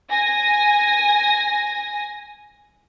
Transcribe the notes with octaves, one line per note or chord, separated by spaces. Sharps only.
G#5 A#6